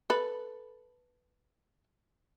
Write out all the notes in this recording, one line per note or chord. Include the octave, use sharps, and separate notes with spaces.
A4 B4